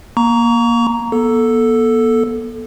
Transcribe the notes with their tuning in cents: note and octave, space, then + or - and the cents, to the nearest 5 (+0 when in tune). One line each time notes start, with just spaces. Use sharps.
A#3 +20 A#5 +0 C#6 +35
B3 -40 A4 +0